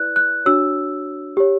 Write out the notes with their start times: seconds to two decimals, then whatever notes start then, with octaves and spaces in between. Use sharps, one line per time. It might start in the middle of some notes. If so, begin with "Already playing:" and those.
Already playing: E4 B4 D5 F#6
0.16 F#6
0.46 D4 F#4 C#5 E6
1.37 G4 C#5